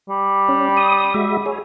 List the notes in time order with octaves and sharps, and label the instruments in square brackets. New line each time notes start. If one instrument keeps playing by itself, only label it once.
[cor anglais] G3
[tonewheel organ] C#4
D#6
G#3 F#4 E5
G#4 C#5